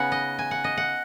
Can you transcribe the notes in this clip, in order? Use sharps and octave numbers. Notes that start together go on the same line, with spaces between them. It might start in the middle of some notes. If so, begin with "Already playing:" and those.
Already playing: C#3 B3 D#4 F#5 G#5
D#5
G#5
F#5
D#5
F#5